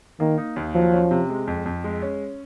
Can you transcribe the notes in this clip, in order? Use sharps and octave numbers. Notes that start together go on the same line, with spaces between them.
D#3 A#3
D#4
D#2
F3 F#3
C#4
C3
G#3
F2
F2
G#3
C#4